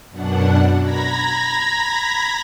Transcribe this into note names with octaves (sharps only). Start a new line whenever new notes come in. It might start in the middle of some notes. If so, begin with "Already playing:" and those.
F#2 B2 D4 F#5
A#5 B5 G#6 A#6 B6